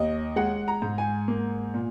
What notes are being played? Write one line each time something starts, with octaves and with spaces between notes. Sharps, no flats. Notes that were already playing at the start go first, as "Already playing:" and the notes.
Already playing: D#2 D#5
G#3 F#5
A#5
G#2
G#5
A#3
A#2